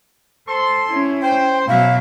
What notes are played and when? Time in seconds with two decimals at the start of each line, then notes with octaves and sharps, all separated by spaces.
0.48 A4 C5 C6
0.89 C#4 E4
1.23 C5 G5
1.67 B2 F#3 E4 F#4 E5 F5